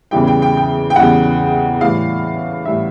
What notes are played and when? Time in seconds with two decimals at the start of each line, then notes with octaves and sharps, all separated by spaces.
0.11 E2 C#3 E3 G3 G5
0.27 G5
0.42 G5
0.57 G5
0.90 G5
0.96 E2 C#3 E3 G3 F#5
1.81 A2 E3 G3 F5
2.65 A2 E3 G3 E5